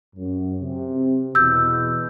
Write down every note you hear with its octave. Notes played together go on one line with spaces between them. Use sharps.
F#2
C3
E2 B2 E6 G6